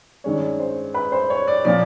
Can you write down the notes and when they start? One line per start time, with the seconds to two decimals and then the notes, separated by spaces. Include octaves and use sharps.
0.24 G2 D#3 G#3 C#4 C#5
0.60 C5
0.94 B4
1.12 C5
1.30 C#5
1.47 D5
1.65 A#2 F3 D5